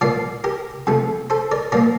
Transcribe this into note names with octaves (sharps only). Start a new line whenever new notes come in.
A#2 F3 A#3 D5 F5
G4 A#4
F2 C3 F3 A3
A4 C5
A#4 D5
A#2 F3 A#3 A#4 D5